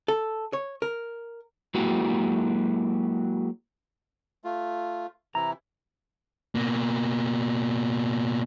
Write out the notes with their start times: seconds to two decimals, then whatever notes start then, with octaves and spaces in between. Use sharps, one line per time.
0.08 A4
0.53 C#5
0.82 A#4
1.74 F#3 G#3 A#3 E4 F#4 G4
4.44 A3 F4
5.35 C3 E3 E4 A#5
6.55 B2 A#3